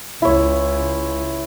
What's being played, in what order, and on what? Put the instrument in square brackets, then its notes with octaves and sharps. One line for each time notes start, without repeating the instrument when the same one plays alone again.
[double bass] C#2 [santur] E4 C#5